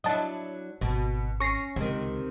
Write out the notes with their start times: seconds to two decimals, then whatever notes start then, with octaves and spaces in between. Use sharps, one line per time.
0.04 F#3 D4 E4 D#5 A5
0.81 G#1 B2
1.40 C#4 C#6 A#6 C7
1.76 C#2 C3 D#3